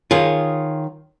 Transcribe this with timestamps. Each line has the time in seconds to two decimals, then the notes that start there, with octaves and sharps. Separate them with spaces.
0.11 D#3 F4 G#4 C#5